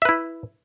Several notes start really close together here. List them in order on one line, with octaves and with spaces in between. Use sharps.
E5 B4 E4